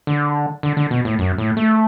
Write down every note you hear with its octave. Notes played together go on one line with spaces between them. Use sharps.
D3
D3
D3
B2
A2
F#2
A2
A3